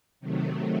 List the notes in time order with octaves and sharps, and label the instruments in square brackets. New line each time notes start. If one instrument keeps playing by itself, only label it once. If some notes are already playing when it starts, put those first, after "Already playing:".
[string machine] C3 D#3 F#3 A3